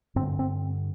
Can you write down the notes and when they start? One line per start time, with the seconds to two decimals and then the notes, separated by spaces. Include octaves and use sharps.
0.16 G2 D3 C4
0.39 C4